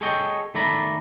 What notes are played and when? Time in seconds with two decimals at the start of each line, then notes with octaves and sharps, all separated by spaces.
0.01 G#4 A4 C#5 D#5 G5
0.54 D#3 A3 A4 D5 A#5 B5